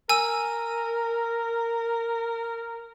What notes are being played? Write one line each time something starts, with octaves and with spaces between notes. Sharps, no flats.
A#4 G#5 E6